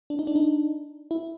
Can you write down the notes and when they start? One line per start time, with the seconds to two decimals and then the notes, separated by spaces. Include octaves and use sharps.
0.10 D4
0.19 D#4
0.27 D4
0.36 D#4
1.11 E4